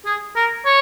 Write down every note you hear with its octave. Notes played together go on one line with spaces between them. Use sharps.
G#4
A#4
C#5